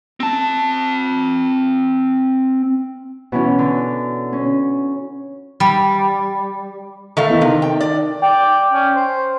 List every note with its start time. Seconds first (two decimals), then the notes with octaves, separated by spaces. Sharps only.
0.20 C4 A5
3.32 B2 E3 C#4
3.59 D3
4.33 C#4
5.60 G3
7.17 D#3 A3 F5
7.29 E2
7.41 C3 D#3
7.62 G5
7.80 D5
8.22 D5 G5
8.72 C#4
8.95 C5